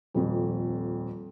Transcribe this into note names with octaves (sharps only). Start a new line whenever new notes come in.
D#1 F2